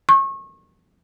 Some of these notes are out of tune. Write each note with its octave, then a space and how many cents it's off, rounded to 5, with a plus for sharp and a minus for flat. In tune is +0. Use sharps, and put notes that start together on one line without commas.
C#6 -30